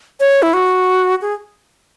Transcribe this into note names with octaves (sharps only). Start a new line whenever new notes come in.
C#5
E4
F#4
G#4